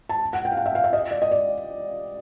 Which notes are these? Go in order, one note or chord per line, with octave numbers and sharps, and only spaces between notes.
A5
F#5
G5
F5
F#5
E5
F5
E5
D#5
D5
D#5
D5